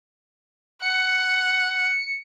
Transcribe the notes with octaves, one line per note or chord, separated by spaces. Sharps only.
F#5 C#7